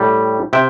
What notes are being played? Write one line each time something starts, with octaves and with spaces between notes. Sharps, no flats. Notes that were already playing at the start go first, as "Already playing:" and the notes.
Already playing: A2 G3
C3 E5 G5